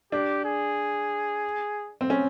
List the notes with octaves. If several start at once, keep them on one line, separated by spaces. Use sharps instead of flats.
D4 G4
G#4
C4
C#4